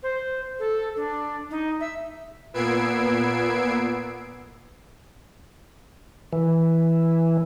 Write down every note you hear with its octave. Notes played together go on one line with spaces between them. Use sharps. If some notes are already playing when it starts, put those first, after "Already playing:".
C5
A4
D4
D#4
E5
A#2 B3 E6 G#6 C7 D7
E3